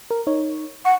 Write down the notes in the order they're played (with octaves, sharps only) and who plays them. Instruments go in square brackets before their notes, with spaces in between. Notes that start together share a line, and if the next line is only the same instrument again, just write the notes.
[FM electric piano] A#4
D#4 C#5
[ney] F#5 [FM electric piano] C#6 C#7